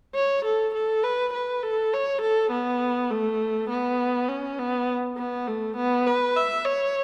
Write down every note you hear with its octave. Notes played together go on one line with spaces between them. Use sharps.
C#5
A4
A4
B4
B4
A4
C#5
A4
B3
A3
B3
C#4
B3
B3
A3
B3
B4
E5
C#5